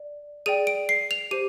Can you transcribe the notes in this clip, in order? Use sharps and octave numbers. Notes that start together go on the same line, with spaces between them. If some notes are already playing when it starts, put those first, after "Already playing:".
Already playing: D5
G#4 D5 G5 D#7
D7
C7
F7
G4 C5 D#7